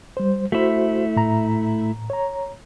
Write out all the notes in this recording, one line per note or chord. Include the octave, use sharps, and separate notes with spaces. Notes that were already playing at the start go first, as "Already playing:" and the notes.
G3 C5
A3 E4 F#4 C5
A2 A#5
C#5 A#5